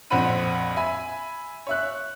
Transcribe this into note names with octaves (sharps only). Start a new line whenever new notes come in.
A#1 F2 C5 F#5 B5 D#7
E5 G#5 B5
C#5 E5 F#6